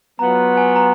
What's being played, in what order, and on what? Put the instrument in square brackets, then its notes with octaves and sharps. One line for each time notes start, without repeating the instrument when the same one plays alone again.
[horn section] F#3 B3 F4 [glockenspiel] A#5
[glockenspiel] G#5
A#5